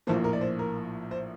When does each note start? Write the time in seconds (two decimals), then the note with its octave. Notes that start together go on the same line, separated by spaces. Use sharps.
0.07 A#1 A2 F3 A#3 C5
0.24 A#4
0.33 D5
0.41 C5
0.59 A#4
1.11 C5